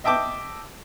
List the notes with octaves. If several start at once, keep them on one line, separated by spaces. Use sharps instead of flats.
D#5 E5 G5 A5 D6